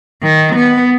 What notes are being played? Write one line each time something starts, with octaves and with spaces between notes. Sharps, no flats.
D#3
B3